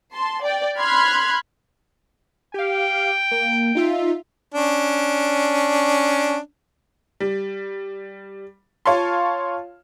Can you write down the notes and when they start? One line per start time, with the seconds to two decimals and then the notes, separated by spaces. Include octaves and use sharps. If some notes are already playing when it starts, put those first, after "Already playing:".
0.13 A5 C6
0.43 D5 G5
0.78 B5 C6 F6 F#6 G#6
2.54 G4 F5 G5
3.31 A#3
3.75 D#4 F4 E5
4.54 C#4 D4
7.20 G3
8.86 F4 C#5 F5 A5 C6